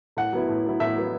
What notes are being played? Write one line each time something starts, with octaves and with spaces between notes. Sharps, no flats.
A2 F#5
F#3 B3 E4
A2
F#3 B3 E4
A2 E5
F#3 B3 E4